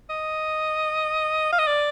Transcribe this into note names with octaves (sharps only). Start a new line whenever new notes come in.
D#5
F5
D#5
D5